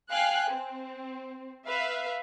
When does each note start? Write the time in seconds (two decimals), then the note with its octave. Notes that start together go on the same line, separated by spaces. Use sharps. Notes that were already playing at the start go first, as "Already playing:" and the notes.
0.11 F5 G5 G#5 F#6
0.50 C4
1.67 B4 E5 F5